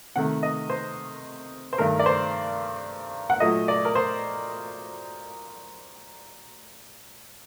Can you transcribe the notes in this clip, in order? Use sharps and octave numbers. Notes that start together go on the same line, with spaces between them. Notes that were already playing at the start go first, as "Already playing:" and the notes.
C3 D#3 A3 F#5
D#5
C5
C5
G2 D#3 A3 A#4
D5
C5
F#5
A#2 F#3 A3 D#5
D5
A#4
C5